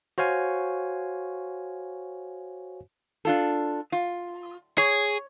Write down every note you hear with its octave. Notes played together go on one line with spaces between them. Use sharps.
F#4 C5 C#5 F5 G#5
D4 F4 A4
F4
G#4 C#5